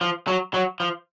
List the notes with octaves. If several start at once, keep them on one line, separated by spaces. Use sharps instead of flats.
F3
F#3
F#3
F3